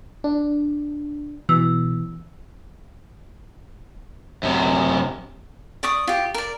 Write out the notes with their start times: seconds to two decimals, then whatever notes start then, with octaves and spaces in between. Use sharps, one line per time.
0.24 D4
1.49 B2 E3 E6
4.43 F#2 C3
5.83 D5 C#6 D#6
6.07 F4 G4
6.34 A#4 D5